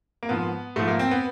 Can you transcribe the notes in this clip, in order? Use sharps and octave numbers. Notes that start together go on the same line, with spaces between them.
A#3
G#2 F3 B3
G#2 F3 A3
A#3
C4
B3